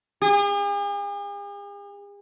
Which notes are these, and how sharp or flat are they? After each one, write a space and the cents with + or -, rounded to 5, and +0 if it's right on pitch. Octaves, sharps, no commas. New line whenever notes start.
G#4 -45